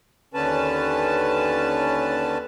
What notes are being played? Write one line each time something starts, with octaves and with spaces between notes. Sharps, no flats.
D#2 D3 C#4 B4 A5